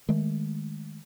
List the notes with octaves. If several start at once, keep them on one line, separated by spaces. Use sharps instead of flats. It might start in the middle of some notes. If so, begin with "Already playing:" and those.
D#3 G#3 A3